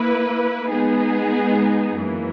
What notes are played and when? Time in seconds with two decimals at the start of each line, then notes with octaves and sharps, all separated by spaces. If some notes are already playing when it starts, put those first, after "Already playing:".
Already playing: A#3 E4 B4
0.69 G#3 B3 D#4 G#4
1.98 F#2 E3 A#3